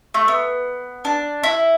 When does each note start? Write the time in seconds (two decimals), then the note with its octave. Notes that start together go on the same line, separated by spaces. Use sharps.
0.14 A3
0.28 B3
1.05 D4
1.43 E4